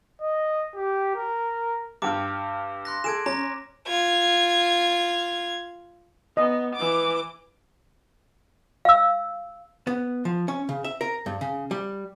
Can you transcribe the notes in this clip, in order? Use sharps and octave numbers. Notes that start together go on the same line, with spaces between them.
D#5
G4
A#4
G2 G5 D6 F6
C6 F#6 A#6
G#4 A4 G#6 D7 E7
C#4 A#5 A#6
F4 G#6
B3 D#5
E3 D6
F5 E6
B3
F3
C#4
C#3
E5
A#4
G2
C#3
G3